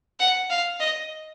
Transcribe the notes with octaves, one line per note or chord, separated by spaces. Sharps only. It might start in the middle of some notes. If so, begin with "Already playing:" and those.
F#5
F5
D#5